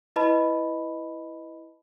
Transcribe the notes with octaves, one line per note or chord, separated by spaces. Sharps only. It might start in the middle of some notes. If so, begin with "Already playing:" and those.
E4 B4 D#5 A5 B5